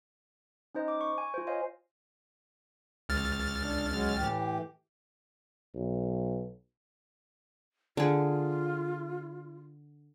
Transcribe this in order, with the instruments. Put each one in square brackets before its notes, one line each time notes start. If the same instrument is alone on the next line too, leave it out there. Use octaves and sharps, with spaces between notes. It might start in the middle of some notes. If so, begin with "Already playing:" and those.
[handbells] C#4 D#4 C5 D#5
D6
C#6
G#5
F4 C5
C5 C#5 D#5 F5 G#5
[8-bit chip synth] C#2 F6 A6
[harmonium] D4
F#3 G#3 C#4
A2 E3 G4
[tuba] B1
[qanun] D3 G#4 [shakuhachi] F4